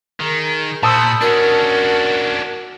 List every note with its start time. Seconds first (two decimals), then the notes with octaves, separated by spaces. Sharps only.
0.20 D#3 G#4 A#4
0.83 A#2 C5 A5 B5 D#6 E6
1.21 C#4 D4 F#4 A#4